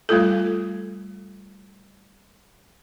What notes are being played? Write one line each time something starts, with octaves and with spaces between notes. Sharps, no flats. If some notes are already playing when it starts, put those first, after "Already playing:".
G3 A3 F4 A4